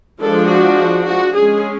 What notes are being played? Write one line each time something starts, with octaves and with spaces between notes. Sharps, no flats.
F3 G#3 D4 A4
F#4
F#4
G#3 C#4 G#4